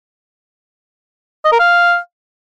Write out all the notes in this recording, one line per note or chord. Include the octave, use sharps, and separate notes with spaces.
D#5
A#4
F5